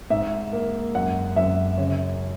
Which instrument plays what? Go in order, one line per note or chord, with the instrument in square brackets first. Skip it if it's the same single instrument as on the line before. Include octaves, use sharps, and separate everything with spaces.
[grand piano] G#2 E5
A#3
F#2 F#5
F#2 E5
C#3 C#5